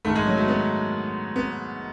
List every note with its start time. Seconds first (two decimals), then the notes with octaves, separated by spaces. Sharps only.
0.05 G#2 D#3 A3
0.15 G#3
0.27 F#3
0.37 A3
0.48 B3
1.36 B3